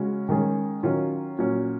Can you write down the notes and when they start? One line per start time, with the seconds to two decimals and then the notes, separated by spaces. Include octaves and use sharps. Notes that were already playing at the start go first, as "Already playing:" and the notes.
Already playing: C#3 G#3 C#4 F#4
0.29 D#3 G#3 C#4 G#4
0.83 D#3 F#3 C#4 F4
1.38 A#2 F#3 C#4